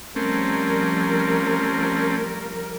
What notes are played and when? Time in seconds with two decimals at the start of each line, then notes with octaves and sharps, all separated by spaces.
0.16 F3 G3 A3 C4 C#4 A#4